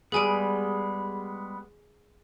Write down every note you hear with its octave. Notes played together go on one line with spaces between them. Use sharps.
G3 G#3 B3 G#4 G#5 D7